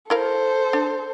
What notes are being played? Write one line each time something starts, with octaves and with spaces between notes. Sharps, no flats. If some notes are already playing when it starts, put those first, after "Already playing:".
E4 A4 A#4 C5 F5
D4